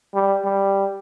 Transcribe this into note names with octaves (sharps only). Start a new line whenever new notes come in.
G3
G3